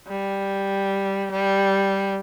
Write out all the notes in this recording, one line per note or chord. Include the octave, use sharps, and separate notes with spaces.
G3
G3